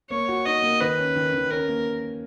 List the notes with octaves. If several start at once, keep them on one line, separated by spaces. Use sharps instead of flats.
A#3 C#5
F#4
D#4 D#5
A#3
D#3 B4
C#4
D#3
D#3
C#4 A#4
A#3